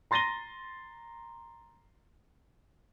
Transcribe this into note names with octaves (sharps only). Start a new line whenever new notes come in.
A#5 C6 A6 A#6 D#7 G7